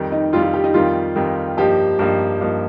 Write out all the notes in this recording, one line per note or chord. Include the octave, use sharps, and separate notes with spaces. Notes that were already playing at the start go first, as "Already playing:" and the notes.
Already playing: F2 D#3 G3
D#4
F2 D#3 G3 F4
F4
G4
D#4
F2 D#3 G3 F4
F2 D#3 G3
G2 F3 A#3 D#4 G4
G2 F3 A#3 D#4 G4
G2 F3 A#3 D#4